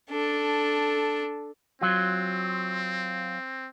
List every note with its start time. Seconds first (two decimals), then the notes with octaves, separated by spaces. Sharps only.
0.10 D4 A4
1.81 F#3 C4 F4